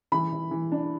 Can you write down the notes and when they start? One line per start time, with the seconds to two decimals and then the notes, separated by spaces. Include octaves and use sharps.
0.12 E3 B5
0.32 E3
0.51 E3
0.72 D4